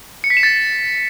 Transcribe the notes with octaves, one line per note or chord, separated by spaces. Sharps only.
C#7
B6
E7
A6